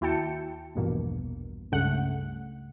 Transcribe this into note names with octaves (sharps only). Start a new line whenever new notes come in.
D#2 E4 F#4 G5 A5 C#7
A#1 E2 G2 B2 A#3
C#2 G2 C#3 A3 F#5 F#6